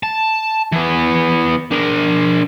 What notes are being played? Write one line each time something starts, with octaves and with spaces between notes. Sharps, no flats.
A5
E3 B3
D4 A#4